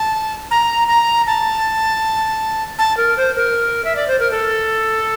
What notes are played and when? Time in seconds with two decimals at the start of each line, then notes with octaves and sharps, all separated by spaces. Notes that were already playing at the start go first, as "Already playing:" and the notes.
Already playing: A5
0.51 A#5
0.88 A#5
1.27 A5
2.79 A5
2.97 A#4
3.17 C5
3.36 A#4
3.85 E5
3.96 D5
4.08 C5
4.19 A#4
4.31 A4